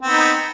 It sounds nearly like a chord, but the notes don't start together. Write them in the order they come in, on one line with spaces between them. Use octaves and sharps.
C4 B3 D#4